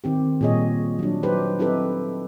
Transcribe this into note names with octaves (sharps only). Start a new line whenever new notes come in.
D#3 C4 G4
A#2 G3 G#4 C#5 D#5
F#3 D4
F#3 D#4 G4 B4 C5
C4 D#4 E4 G4 A4 B4